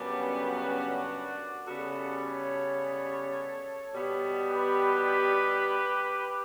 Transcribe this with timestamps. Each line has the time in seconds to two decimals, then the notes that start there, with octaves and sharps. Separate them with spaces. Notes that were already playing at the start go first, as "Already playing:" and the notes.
Already playing: F#2 C#3 G3 B3 D4 F#4
0.53 D4 F#4
1.66 C#3 G3 B3 F#4 A4
2.23 A4 C#5
3.94 B2 G3 B3
4.50 G4 B4